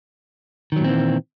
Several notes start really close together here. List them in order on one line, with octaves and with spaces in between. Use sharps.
D#3 F#3 A#2 C4 E3